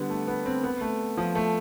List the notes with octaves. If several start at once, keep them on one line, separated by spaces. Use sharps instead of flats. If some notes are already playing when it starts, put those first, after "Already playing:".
Already playing: D3 G3 B3
A3
B3
C4
B3
A3
F3
A3